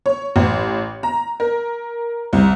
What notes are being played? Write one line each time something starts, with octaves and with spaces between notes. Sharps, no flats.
C#5
A1
A#5
A#4
C2